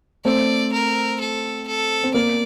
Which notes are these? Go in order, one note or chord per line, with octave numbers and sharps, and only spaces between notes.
A3 C4 D5
A#4
A4
A4
C4
A#3 D5